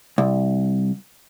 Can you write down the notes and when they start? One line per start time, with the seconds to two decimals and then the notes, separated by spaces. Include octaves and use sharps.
0.18 C2